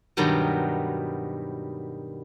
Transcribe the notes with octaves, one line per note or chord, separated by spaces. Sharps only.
G2 B2 D#3 F#3 G3 A#4